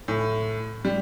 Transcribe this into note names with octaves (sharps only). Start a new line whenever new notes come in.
A2
G3